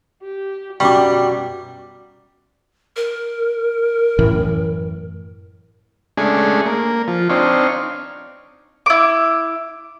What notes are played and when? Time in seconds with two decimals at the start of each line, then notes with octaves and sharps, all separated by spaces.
0.22 G4
0.80 F#2 B2 G3 F#4 G5 C#6 D6
2.96 A#4
4.19 F#2 A2 E3
6.17 G#3 A3 C#4 D4 G#4
6.66 A#3
7.08 F3
7.30 C4 D4 D#4 C#5 F5
8.86 E4 D6